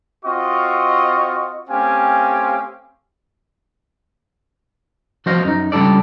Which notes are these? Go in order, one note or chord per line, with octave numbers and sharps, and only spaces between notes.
C4 F4 F#4 D#5 C#6
A3 C4 C#4 G4 F5 G#5
F3 F#4 C5 D#5 F5
F#2 D#4
C#2 G3 D4 A4 D5